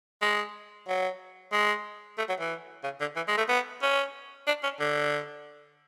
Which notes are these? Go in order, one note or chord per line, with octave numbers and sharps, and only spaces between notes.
G#3
F#3
G#3
A3
F#3
E3
C#3
D3
E3
G#3
A3
B3
C#4
D4
C#4
D3